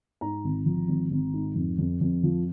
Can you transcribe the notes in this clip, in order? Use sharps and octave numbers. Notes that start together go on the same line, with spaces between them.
G#2 A#5
G#1
F3
G#1
G#1
G#2
F2
F2
F2
F3